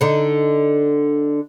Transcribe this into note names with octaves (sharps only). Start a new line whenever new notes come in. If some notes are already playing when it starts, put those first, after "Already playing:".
D3 D#4